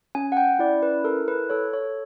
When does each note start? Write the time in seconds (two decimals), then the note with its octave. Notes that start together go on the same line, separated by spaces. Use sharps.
0.15 C#4 G#5
0.32 F#5
0.37 G5
0.59 E4 D5
0.83 B4
1.04 A4 A#4
1.28 B4
1.50 A4 C#5
1.73 C#5